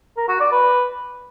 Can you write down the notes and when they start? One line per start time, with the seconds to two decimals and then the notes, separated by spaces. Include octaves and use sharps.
0.17 A#4
0.29 F#4
0.40 D5
0.52 B4